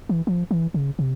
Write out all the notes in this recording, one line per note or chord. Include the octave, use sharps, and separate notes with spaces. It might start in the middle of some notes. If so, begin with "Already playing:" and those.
E3
F3
E3
C#3
C3